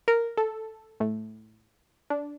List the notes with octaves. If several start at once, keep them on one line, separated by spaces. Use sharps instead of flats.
A#4
A4
A2
D4